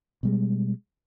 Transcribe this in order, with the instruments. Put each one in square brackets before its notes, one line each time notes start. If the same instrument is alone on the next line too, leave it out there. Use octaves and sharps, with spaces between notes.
[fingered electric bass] B2 G3 G#3